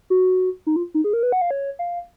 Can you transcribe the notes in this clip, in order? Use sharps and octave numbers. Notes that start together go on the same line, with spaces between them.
F#4
D#4
F4
D#4
G#4
A#4
B4
F#5
F5
C#5
F5